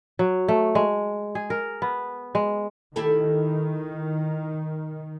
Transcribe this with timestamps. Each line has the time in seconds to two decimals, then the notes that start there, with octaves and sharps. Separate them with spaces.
0.19 F#3
0.48 A3
0.75 G#3
1.35 G#4
1.50 A#4
1.82 B3
2.35 G#3
2.96 D#3 E4 G4 A4